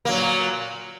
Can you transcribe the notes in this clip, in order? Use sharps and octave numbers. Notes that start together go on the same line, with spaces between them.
A#2 F#3 A#3